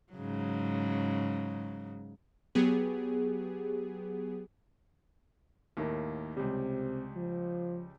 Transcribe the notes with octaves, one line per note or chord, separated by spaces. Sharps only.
G#2 C#3 F#3
F#3 B3 G4 G#4
D#2 A2 A#3
C#2 C3 G3
F3